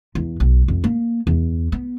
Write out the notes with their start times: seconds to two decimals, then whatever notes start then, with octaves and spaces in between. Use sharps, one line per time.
0.15 E2
0.40 B1
0.68 F2
0.84 A#3
1.27 E2
1.72 B3